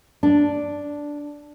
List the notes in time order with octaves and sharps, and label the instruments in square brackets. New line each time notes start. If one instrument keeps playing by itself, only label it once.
[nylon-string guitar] D4